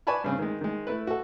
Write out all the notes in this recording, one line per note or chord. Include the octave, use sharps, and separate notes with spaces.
B4 D5 G#5 A5 B5 C#6
G2 C#3 C4
D#3 G#3
D#3 G#3
A3 E4 B4
F#4 A4